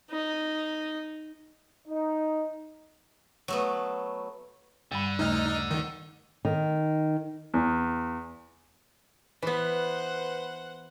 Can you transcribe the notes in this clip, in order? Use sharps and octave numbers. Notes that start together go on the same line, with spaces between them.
D#4
D#4
F#3 A3 B3
G2 D3 G3 B5
D#2 C#3 A3 D#4 F6
D#3
D#3
E2
E3 B3 B4 C5 F#5